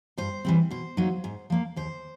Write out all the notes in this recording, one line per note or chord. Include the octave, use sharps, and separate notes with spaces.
G2 C5
E3 G3 C4
B2 C5
F#3 A#3 D#4
G#2
F3 A#3
D#2 C5